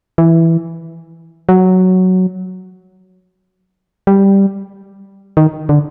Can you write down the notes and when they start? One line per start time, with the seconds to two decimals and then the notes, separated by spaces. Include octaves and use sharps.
0.18 E3
1.49 F#3
4.07 G3
5.37 D#3
5.69 D3